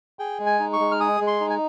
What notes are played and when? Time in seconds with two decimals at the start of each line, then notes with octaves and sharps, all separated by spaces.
0.19 G#4 G5
0.40 G#3
0.46 G#5
0.59 D#4
0.73 C#6
0.80 G#3
0.91 F6
1.00 G#4 D#6
1.21 G#3
1.27 C6
1.40 D#4
1.50 G#5